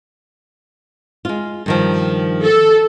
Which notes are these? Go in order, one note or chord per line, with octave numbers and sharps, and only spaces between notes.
G#3 F4
G2 D#3 F3
A4